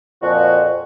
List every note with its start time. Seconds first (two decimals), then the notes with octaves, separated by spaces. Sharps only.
0.21 F2 A#2 F3 F#4